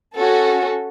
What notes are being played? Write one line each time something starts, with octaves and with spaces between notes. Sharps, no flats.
C#4 F#4 A4